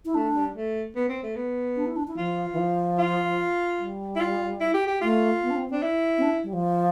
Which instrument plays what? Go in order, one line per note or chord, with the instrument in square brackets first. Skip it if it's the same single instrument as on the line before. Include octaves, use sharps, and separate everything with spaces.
[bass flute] E4
[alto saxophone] A3 [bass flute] D4
[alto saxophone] G3
A3
B3
C4
A3
B3
[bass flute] D4
E4
D4
E4
[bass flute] F3 [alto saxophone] F4
[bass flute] E3
F3
[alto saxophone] F4
[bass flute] G3
[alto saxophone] E4
F4
E4
G4
G4
[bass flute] A3 [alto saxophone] F4
[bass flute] B3
D4
C4
[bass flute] C4 [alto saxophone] D4
[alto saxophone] E4
[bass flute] C4
D4
G3
F3